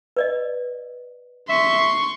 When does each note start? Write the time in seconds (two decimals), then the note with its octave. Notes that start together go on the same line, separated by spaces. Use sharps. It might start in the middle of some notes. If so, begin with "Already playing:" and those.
0.17 B4 D5 D#5
1.49 E5 C6 C#6